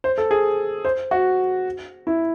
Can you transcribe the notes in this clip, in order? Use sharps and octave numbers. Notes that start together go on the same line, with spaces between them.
C5
A4
G#4
C5
F#4
E4